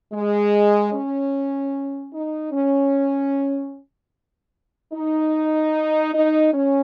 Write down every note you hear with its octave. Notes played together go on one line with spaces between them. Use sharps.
G#3
C#4
D#4
C#4
D#4
D#4
C#4